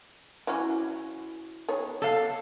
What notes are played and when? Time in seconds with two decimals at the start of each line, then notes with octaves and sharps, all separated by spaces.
0.47 E3 F#3 C#4
1.69 D#3 B3 C#5
2.02 A4 F5